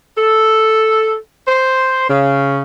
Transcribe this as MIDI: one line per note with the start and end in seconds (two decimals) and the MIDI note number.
0.17 1.15 69
1.48 2.09 72
2.09 2.63 49